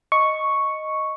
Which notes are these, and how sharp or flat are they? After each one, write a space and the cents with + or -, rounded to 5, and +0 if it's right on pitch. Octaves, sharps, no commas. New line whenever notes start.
D#5 +0 C#6 +0